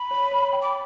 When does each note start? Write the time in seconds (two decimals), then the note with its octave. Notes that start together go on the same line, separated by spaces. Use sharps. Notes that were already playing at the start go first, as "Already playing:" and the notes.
Already playing: B5
0.11 C#5
0.31 C#5
0.53 G5
0.62 D6